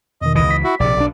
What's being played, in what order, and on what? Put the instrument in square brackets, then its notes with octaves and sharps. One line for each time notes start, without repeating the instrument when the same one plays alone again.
[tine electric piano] E2 B2 D#3 [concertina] D#5
[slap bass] C#2 E3 [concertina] D#5
[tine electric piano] B6
[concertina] E4 F#4
[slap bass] A#1 C3 [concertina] D5
[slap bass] B1 D4